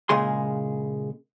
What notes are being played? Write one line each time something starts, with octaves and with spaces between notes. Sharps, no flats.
A#2 C#3 G#3 G#4 C6